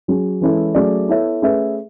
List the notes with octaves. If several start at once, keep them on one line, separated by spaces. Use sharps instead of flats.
F#3 C#4 G#4
E3 G#3 C#4 E4 A4
F#3 A3 C#4 G#4 D5
B3 E4 A4 C#5 E5
A3 C#4 G#4 B4 E5